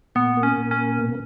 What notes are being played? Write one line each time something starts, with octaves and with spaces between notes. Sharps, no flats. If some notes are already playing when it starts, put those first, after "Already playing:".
A#2 B3
A#3
C#4
A#2
C#4
A#3
B2